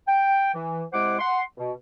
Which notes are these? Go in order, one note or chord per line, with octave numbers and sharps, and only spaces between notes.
G5
E3
C3 G#3 E4 C5 F#5 D6
F#5 C6
B2